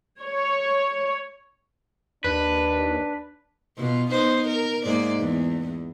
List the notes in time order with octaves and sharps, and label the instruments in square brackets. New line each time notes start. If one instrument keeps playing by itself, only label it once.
[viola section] C#5
[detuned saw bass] D#2 [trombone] D4 [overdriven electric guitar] B4
[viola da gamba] B2 F4
B3 D#4 C5
A#4
G#2 A#3 D5
E2